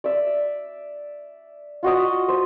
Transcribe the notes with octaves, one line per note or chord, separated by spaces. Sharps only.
D5 E5
F4 F#4 D#5 D#6
C5